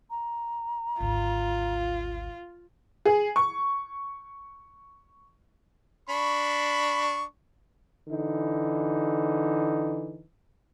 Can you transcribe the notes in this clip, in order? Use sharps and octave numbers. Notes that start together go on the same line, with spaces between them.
A#5
G#1 D2 F4
G#4
C#6
D4 B5 C#6
D3 E3 D#4